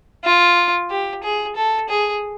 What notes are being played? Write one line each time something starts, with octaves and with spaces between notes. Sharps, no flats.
F4
G4
G#4
A4
G#4